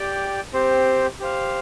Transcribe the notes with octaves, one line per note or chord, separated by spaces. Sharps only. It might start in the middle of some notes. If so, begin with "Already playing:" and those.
Already playing: G4 D5 G5
C4 G4 C5
G4 C5 F5